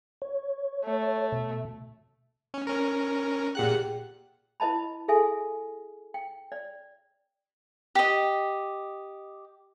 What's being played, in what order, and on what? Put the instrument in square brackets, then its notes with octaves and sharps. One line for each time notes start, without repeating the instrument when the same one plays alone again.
[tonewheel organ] C#5
[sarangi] A3
[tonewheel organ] B2
[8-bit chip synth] C#4
C#4 A#4
[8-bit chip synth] A#2 F#5 F#6 [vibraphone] G4 G#4 G5
[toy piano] E4 B4 D#5 A5 B5
G#4 A4 E5 G#5
G5
D5
[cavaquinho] G4 D#5